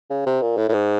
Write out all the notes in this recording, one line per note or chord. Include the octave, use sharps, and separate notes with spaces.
C#3
C3
A#2
A2
A2
G#2